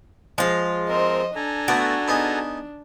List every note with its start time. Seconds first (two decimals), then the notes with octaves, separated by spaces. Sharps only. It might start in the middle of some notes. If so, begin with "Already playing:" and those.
0.38 F3 G#3 F4
0.89 C4 A#4 C5 D#5
1.36 D4 A4 G#5 A#5
1.68 A3 B3 F#4 D5
2.08 B3 D#4 G#4